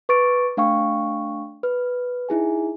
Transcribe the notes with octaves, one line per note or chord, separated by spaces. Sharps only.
B4 C#6 D6 A6 D7
A3 D4 F5 G5 C#6
B4 F6
D#4 E4 G#4 G#5